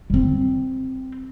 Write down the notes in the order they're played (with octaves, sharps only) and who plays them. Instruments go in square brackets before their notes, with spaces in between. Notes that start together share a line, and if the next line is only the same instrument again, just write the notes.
[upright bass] G3 C4